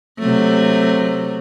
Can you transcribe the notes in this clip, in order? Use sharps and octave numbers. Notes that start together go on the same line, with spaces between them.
C3 F#3 A3